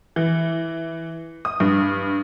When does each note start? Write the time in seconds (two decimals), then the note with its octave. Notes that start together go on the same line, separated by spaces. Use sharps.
0.16 E3
1.45 D#6
1.60 G2